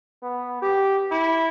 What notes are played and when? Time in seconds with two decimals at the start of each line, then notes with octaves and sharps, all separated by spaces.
0.22 B3
0.62 G4
1.11 E4